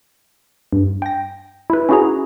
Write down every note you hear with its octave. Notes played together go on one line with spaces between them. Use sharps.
G2
G5 A#6
E4 B4
C#4 E4 F#4 G#4 A#5